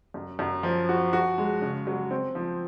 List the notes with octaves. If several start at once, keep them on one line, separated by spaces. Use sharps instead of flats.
F#2
F#2
F3
F#4
F#4
G#3
C#3
F#3
C4
F3